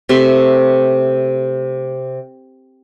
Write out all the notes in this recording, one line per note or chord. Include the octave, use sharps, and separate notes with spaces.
C3 A3 E5 C6